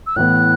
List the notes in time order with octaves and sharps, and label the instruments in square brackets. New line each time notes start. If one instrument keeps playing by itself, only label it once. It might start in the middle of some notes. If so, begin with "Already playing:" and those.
[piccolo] E6
[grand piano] A2 E3 B3 [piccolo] F#6